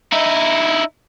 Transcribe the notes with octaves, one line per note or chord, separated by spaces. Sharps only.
D#4 E4